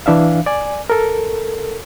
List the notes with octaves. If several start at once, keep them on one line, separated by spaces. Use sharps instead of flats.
E3 D4 E5 F5
D5 G#5
A4 A#4